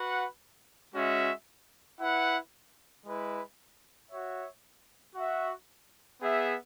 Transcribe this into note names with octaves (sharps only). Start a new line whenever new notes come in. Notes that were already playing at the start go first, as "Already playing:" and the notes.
Already playing: F#4 B4 F#5
G#3 C#4 F#4 E5
E4 B4 F#5
G#3 E4 B4
F#4 C#5 E5
F#4 E5
B3 G#4 E5